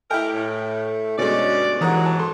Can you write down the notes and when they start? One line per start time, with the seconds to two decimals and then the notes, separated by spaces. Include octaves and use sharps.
0.11 A3 E4 G4 A#4 G5
0.34 A2
1.18 D2 G2 B2 G#3 C#4 D5
1.81 D#2 G#2 E3 F#3 F#5 A#5 D#6
2.06 A5
2.19 A4 C6